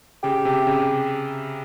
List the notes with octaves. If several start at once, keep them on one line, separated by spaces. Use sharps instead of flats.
C#3 G4
C3
C#3